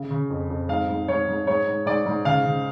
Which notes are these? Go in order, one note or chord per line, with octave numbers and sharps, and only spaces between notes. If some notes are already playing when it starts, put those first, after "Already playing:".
Already playing: C#3
C#3
F2
F2
G#2 F5
G#2
G#2 C#5
G#2
G#2 C#5
G#2
G#2 D5
G#2
C#3 F5
C#3